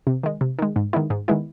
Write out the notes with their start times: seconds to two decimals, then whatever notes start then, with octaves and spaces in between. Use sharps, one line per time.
0.07 C3
0.23 D#3 G#3
0.41 C3
0.59 D#3 G#3
0.76 G#2
0.93 D#3 G#3 B3 E4
1.10 G#2
1.28 D#3 G#3 B3 E4